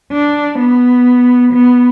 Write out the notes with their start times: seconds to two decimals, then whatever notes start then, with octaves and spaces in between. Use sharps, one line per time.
0.12 D4
0.59 B3
1.53 B3